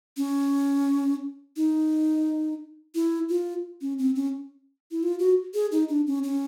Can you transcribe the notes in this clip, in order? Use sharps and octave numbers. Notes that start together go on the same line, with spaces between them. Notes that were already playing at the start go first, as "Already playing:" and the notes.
C#4
D#4
E4
F4
C#4
C4
C#4
E4
F4
F#4
G#4
D#4
D4
C#4
C#4